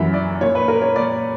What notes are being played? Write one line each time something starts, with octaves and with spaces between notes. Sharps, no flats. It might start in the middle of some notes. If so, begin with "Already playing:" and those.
Already playing: F#2 E3 E5
D5
A#2 C#5
B4
A#4
C#5
A#2 D5